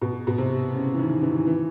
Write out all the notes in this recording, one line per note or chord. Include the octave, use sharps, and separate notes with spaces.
B2
B2
C3
C#3
E3
D#3
E3
E3